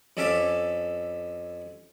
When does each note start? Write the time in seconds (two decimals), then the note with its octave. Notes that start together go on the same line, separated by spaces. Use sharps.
0.17 F2 C#4 A4 E5 F5 D6